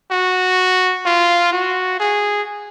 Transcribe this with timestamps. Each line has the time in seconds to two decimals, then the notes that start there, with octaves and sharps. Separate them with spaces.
0.11 F#4
1.05 F4
1.52 F#4
2.00 G#4